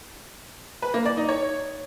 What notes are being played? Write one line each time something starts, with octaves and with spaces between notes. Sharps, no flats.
B4
A#3
D5
D#4
C#5